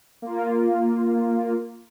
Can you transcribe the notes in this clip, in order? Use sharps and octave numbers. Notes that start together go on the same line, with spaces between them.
A#3 F4